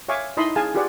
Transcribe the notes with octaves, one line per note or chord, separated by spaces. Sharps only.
C#5 E5 F5 G#5 C#6 D6
D#4 E4 D#5 A5 B5 C6
G#4 F5 G#5 A5
F4 G4 G#4 B4 D5 F#5